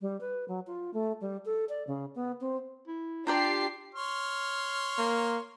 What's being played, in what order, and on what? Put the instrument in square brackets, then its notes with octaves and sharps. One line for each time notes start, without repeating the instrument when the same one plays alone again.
[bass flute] G3
B4
F#3
F4
A3
G3
A4
D5
C#3
B3
C4
[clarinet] E4
[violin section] D4 G4 C7 [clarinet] F4 [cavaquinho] D5 G5 A#5
[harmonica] C#5 C6 F6
[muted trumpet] A#3